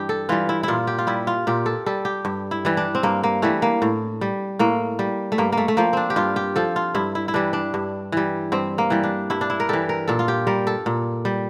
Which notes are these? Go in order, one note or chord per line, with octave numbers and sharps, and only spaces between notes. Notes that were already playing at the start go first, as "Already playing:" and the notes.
Already playing: G2 E3 G4
A4
E3 G3 F4
E4
A#2 E4 F4
G4
F4
G3 E4
F4
A#2 G4
A4
G3 A4
G4
G2
E4
E3 G3
D4
C4
G2 A#3
A#3
E3 G3 A3
A#3
A2
G3
A2 A#3
G3
A3
G2 A#3
A#3
A3
A3
F3 A#3
C4 D4
G4
G2 F4
G4
F3 A4
F4
G2 E4
E4
E4
E3 G3 D4
D4
G2
E3 G3
G2 C4
A#3
E3 G3
D4
G2 E4
D4
E4
A#4
E3 G3 A4
A#4
A#2 A4
F4
G4
G3 A#4
A4
A#2
G3